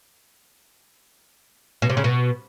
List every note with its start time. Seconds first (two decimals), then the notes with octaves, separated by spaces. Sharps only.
1.82 B2
1.90 C3
1.97 C#3
2.04 B2